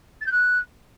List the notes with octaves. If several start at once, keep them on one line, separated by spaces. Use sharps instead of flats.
A6
G6
F#6